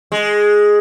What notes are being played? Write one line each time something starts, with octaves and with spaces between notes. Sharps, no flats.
G#3